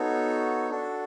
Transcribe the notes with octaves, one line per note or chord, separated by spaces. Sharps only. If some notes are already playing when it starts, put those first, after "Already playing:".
Already playing: B3 D#4 F#4 A4 C#5
D4 F#4 A4